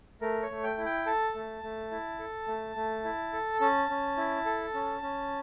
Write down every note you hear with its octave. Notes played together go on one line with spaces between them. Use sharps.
A3 A#4
C#5
A3
G5
E4
G5
A4 A5
A3
A3
E4
A4
A3
A3
E4
A4
C#4 A5
C#4
E4
A4
C#4
C#4